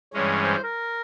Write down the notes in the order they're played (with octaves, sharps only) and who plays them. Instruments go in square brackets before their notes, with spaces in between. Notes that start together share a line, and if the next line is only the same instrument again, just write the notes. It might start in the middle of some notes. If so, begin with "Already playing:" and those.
[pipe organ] G2 E3 G#3 C#4 [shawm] C#5
[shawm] C5
C5
A#4